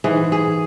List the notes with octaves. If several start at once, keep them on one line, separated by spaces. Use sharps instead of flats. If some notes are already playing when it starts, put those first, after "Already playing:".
G#2 E3 G#4
G#4